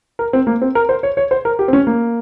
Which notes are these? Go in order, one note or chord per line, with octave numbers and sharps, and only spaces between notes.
A#4
C4
A#3
C4
A#4
C5
C#5
C#5
C5
A#4
G4
C4
C#4
A#3